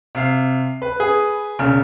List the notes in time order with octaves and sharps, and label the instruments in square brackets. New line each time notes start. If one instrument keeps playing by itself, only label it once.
[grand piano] C3 F5 C7
B4
[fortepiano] G#4
[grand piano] E1 C#3